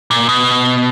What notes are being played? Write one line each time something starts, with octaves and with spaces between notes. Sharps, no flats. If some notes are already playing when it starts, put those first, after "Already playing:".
A#2
B2